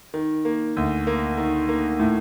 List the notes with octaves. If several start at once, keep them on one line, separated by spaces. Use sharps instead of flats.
D#3
A#3
D2
A#3
D#3
A#3
A2